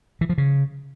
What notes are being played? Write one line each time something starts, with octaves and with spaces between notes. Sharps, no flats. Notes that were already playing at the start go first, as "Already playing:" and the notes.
E3
F3
C#3